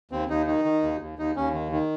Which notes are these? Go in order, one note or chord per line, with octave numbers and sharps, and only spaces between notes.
D#2 C4
D#2 D#4
D#3 D#4
D#3
D#2
D#2
D#2 D#4
D#2 C#4
D#3
D#3